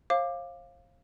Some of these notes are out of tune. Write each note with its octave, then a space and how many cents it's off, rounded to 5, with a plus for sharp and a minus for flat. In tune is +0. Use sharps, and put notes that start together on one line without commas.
C5 +45 F5 +0 D6 +15